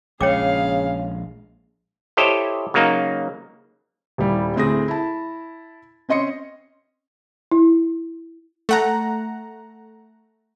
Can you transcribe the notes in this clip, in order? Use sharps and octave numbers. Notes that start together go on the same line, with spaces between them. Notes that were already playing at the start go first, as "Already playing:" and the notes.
A#1 C#3 G#3 G#4 C#5 F5 G5 D6
E4 G4 A4 C5 C#5 D#5
C#3 F#3 A#3 D#4
D#1 G3 E4
D2 A2 C4 G#4 D#6 A#6
E4 A5
C4 C#4 D#5 C6 C#7
E4
A3 F#5 A#5